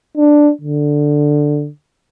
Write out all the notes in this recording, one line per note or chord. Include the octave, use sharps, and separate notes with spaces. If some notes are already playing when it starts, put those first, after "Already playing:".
D4
D3